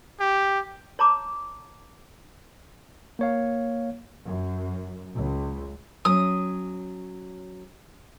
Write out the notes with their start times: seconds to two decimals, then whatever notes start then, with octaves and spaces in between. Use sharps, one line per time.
0.20 G4
0.99 C#5 A5 A#5 D6
3.19 A#3 C#5 F5
4.25 F#2
5.15 C#2
6.05 F#3 C#4 D#6